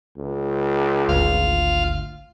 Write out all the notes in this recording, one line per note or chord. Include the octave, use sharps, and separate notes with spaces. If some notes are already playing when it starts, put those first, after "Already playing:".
C#2
G#1 D2 F4 F5